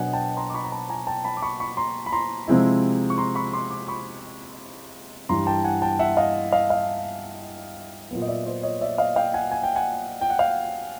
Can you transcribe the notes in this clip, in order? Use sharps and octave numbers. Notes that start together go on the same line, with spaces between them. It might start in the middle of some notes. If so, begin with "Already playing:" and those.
Already playing: B2 F#3 B3 D4 C#5 D#5 F#5 G#5
G5 A5
A#5 C6
D6
B5 C#6
A#5
A5 B5
G#5 A#5
G5 A5
A5 B5
D6
B5 C#6
B5 C#6
A#5 C6
B5
A#5 C6
C3 F3 G#3 C4 E4
C#6
A#5 C6
B5 C#6
C6 D6
C6 D6
B5 C#6
G2 E3 G3 A#5 C6
G5 A5
F#5 G#5
G5 A5
E5 F#5
D#5 F5
D#5 F5
D#5 F5
A#2 F#3 B3
D#5
D5 E5
C5 D5
C#5 D#5
D5 E5
D#5 F5
F5 G5
F#5 G#5
G#5
G5
F#5 G#5
G5
F#5
F5 G5